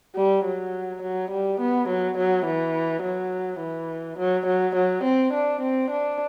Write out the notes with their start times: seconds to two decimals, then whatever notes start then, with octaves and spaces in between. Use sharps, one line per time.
0.15 G3
0.45 F#3
1.02 F#3
1.30 G3
1.60 B3
1.89 F#3
2.17 F#3
2.46 E3
3.02 F#3
3.60 E3
4.18 F#3
4.46 F#3
4.75 F#3
5.04 C4
5.33 D4
5.61 C4
5.90 D4